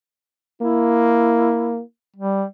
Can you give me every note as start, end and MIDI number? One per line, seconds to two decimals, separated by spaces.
0.62 1.81 58
0.62 1.81 64
2.16 2.45 55